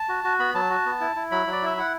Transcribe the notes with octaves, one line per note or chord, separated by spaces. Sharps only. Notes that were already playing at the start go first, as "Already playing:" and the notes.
Already playing: A5
F#4
F#4
B3 B5
F#3 A5
F#4
B3
E4
E4
F#3 B5
F#3
D5
E4 E5
E4 F#5